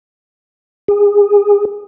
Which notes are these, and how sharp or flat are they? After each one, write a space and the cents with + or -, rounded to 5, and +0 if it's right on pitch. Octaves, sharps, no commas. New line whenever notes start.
G#4 -25